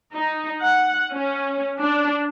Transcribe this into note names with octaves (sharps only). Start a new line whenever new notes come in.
D#4
F#5
C#4
D4